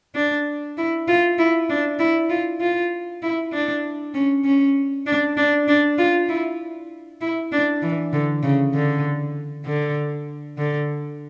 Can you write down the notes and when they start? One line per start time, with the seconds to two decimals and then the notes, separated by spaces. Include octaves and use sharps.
0.15 D4
0.77 E4
1.08 F4
1.38 E4
1.69 D4
1.99 E4
2.30 F4
2.60 F4
3.22 E4
3.53 D4
4.14 C#4
4.45 C#4
5.06 D4
5.37 D4
5.68 D4
5.98 F4
6.29 E4
7.21 E4
7.52 D4
7.82 E3
8.13 D3
8.43 C#3
8.74 D3
9.66 D3
10.58 D3